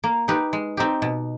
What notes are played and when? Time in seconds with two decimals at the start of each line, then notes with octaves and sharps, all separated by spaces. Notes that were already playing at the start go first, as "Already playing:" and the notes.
0.04 A#3
0.28 D#4 G4 B4
0.53 G#3
0.77 C4 D#4 G4
1.02 B2